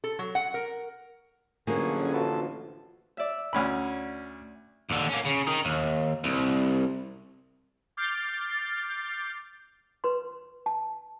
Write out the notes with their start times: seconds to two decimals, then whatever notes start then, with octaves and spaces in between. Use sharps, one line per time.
0.04 A4
0.19 F#3
0.35 F#5
0.54 A#4
1.67 A1 D3 F3 F#3 A#3 C#4 G#4
2.14 F4 F#4 A4 B4
3.17 D5 E5
3.53 D2 C#4 B5
4.90 D#2 D3
5.09 A#3 C#4
5.25 C#3
5.47 D#3 D#4
5.65 D#2
6.24 C2
7.97 D6 F6 G6 A6 C7
10.04 B4 C6
10.66 A5